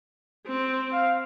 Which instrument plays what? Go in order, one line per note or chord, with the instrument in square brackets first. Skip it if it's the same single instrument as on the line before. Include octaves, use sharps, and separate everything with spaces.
[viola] C4
[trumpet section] F5